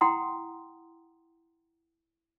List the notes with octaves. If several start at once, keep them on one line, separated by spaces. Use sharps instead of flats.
E4 F#5 G5 A#5 C6 D#6